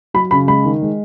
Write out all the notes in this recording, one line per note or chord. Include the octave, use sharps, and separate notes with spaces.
F#3 B5
C#3 B5
G#3 B5
D#3
G#3